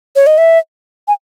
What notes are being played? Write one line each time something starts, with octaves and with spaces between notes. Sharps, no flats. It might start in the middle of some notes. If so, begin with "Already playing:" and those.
C#5
D#5
E5
G#5